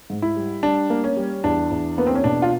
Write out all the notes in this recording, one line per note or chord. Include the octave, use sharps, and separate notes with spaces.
G#2
E4
G3
G3 D4
A#3
C#4
G3
E2 D4
E2
A#3 B3
C4
C#4
B2 D4
F4